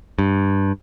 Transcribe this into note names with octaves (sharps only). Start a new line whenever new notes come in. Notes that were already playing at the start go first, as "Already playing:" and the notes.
G2